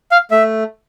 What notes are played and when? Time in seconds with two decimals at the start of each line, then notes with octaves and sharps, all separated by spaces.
0.11 F5
0.31 A3 E5